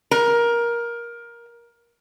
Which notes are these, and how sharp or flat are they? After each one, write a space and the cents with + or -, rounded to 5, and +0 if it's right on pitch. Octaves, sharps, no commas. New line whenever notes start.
A#4 +15